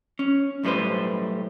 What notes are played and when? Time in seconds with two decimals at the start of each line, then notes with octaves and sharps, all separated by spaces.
0.19 C#4
0.63 B1 A2 G3 B4 C5